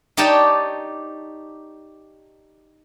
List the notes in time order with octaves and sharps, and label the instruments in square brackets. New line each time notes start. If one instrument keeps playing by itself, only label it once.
[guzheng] D#4 G4 C#5 D5 G5 A5